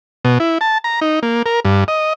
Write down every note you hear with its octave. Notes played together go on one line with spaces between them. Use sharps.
B2
E4
A5
A#5
D#4
A#3
A#4
G2
D#5